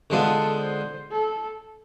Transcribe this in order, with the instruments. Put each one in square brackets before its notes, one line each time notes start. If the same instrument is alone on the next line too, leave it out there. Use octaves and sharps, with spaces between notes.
[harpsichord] D3 G#3 B3 F4 [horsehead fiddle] A4
[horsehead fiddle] C5
A4